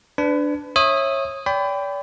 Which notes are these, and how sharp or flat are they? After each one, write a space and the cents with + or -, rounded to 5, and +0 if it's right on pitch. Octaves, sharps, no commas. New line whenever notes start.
D4 +0 B4 +30
C#5 -25 E5 +0 D#6 +0
D5 -40 G5 +5 B5 +30